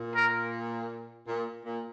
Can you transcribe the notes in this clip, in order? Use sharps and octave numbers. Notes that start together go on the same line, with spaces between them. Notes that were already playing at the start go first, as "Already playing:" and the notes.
Already playing: A#2
A#4
A#2
A#2